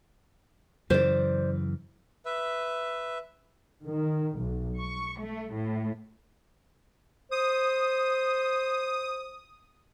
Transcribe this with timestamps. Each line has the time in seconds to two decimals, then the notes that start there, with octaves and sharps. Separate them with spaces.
0.90 F#2 C#3 E3 C5 D5
2.25 B4 E5
3.83 D#3
4.37 B1
4.77 C#6
5.19 A3
5.54 A2
7.31 C5 D#6